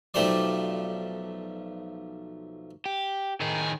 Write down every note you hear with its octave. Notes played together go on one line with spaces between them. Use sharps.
B1 F3 A3 G4 C5 D5
G4
A2 D#3 D#4 G#4